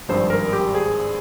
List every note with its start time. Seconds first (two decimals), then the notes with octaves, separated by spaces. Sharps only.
0.08 G#1 G2 F3 C5
0.30 A#4
0.53 G4
0.75 G#4